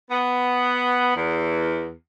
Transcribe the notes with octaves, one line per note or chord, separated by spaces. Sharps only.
B3
E2